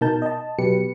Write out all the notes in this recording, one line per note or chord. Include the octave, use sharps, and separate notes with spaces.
B2 D#4 A#4 A5 G6
D#5 A5
B2 F#3 G4 B4 C#7